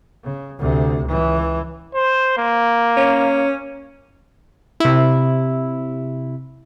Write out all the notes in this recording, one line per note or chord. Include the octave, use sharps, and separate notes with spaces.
C#3
D2 C3
C#2 E3
C5
A#3
C#4
C3 E4